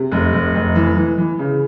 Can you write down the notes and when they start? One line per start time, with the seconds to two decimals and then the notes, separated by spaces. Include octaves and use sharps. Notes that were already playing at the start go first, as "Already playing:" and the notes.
Already playing: C3
0.12 F1
0.33 F1
0.54 F1
0.75 E3
0.97 E3
1.18 E3
1.39 C#3